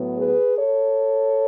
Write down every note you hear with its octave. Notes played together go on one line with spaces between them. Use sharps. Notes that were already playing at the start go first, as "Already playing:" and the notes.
Already playing: A2 F#3 B3
G#4 B4
A4 C#5